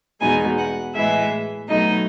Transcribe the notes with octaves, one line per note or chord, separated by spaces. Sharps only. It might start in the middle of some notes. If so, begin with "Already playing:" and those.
E2 B2 G#3 D#4 G#5
F#5
A2 E3 G#3 E5
B2 F#3 A3 D#4 D#5